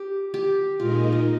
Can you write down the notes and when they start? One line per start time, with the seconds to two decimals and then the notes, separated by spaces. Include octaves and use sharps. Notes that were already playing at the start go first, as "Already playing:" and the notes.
Already playing: G4
0.34 G4
0.79 A#2 G#3 D#4 F4 A#4 D#5
1.12 F4